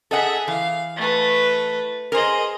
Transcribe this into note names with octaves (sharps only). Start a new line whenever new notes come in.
G#4 A4 D#5 E5 F#5
E3 F5
A3 B4
G#4 A#4 C5 D#5